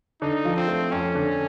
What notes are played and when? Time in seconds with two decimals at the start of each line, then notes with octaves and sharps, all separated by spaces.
0.21 D3 D#4
0.45 F3
0.56 C4
0.68 A3
0.91 F2 C#4
1.15 D3